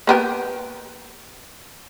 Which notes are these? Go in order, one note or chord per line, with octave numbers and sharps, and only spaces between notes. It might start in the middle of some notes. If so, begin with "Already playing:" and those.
A#3 B3 G4